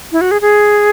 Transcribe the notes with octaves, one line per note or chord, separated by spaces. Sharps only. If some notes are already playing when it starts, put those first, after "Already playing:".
E4
F#4
G#4
G#4